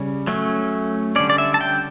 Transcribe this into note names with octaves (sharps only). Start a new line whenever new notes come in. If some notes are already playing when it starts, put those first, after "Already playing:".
Already playing: C#3 G3 C#4
F#3 A3 C#4
D3 G3 C#4 D5
D5
E5
A5
G5